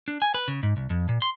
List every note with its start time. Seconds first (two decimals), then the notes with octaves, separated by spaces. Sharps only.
0.08 D4
0.22 G#5
0.34 B4
0.48 C#3
0.63 G#2
0.77 C2
0.90 F2
1.09 A#2
1.22 C6